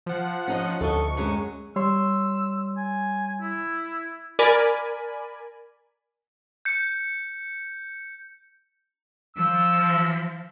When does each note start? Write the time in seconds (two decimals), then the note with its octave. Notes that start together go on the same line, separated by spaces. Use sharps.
0.06 F3 F#5
0.48 C#4 D#4 D#5
0.81 D2 A4 D#5 C#6
1.17 F#2 G#3 C#4
1.76 G3 C#5 C6 E6
2.77 G#5
3.42 E4
4.39 A#4 D5 G#5 B5
6.65 G6 C#7
9.36 F3 E6